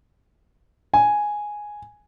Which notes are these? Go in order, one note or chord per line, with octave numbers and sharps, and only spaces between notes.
G#5